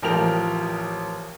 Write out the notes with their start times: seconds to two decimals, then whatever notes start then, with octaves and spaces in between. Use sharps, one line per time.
0.02 A1 F3 A#4 G5 F6 F7